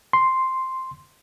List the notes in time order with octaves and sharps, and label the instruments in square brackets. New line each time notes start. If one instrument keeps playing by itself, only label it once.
[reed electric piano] C6